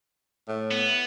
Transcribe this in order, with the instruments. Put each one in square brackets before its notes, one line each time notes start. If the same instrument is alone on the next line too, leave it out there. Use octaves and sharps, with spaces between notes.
[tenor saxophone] A2
[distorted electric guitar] B3